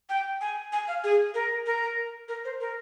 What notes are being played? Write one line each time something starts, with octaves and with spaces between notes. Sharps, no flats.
G5
G#5
G#5
F5
G#4
A#4
A#4
A#4
C5
A#4